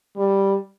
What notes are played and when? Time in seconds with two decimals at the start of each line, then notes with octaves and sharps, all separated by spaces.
0.16 G3